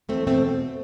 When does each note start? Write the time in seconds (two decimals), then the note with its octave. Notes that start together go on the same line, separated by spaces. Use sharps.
0.09 E2 A3 C4
0.26 B2 A3 C4